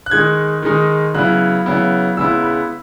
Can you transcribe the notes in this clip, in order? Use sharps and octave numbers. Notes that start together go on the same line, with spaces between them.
F#6
D#3 G#3 D#4 G#6
D#3 G#3 D#4
C#3 F#3 B3 E4 F#6
C#3 F#3 B3 E4
C#3 G#3 B3 E4 E6
B5